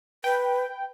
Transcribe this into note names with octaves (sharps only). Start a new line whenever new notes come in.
B4 G5